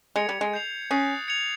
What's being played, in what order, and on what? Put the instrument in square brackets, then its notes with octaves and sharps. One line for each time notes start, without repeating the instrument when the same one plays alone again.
[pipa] G#3 [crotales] G#6 C#7 F7
[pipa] G3
G#3
[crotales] G6 C7 F7
[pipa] C#4 [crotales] D#6 F#6 A6 C7
[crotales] G#6 C#7 F7